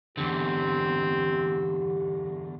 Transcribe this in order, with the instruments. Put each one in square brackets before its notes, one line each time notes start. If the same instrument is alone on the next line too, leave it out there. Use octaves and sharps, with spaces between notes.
[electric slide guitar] E2 D3 [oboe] C4 [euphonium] G4